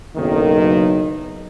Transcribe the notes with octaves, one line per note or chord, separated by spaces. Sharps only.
F#1 B1 D#3